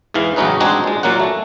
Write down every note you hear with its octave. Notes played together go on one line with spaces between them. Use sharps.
E2 G#2 E3 F5
A1 C#3 F#3 C#4 D#4 B4
G#3 C4 D4 D#4 F#4 G#4
A#2 G#3
A#2 F#3 A#3 C#4 F#5
A3